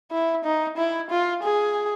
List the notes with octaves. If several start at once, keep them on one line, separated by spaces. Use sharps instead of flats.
E4
D#4
E4
F4
G#4